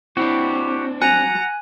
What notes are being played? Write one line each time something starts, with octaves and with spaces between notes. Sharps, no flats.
C4 D4 E4 F#4 G4
F#5 G#5 A#5 F#6